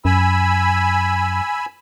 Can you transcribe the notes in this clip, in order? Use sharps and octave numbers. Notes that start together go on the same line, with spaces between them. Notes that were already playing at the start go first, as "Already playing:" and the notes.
F#2 G#5 B5 E6